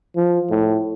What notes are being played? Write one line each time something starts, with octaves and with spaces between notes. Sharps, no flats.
F3
A2